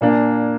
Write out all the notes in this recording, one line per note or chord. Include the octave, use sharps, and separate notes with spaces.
A#2 A#3 D4